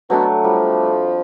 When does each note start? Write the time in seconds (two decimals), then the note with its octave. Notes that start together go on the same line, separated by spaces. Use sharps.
0.10 B2 F#3 A3 D4
0.44 F2 F3 G3